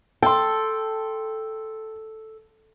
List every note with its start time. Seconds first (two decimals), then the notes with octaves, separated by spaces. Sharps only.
0.22 A4 G5 C6